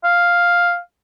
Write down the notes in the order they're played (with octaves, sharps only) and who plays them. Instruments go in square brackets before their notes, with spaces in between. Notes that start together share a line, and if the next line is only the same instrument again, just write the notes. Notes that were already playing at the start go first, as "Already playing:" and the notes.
[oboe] F5